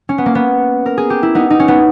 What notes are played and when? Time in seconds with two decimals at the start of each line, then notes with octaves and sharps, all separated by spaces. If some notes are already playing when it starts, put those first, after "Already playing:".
0.09 C#4
0.18 B3
0.26 A#3
0.35 B3
0.86 A#4
0.98 G#4
1.10 G4
1.23 E4
1.35 B3 D#4
1.50 D#4
1.60 C#4
1.68 B3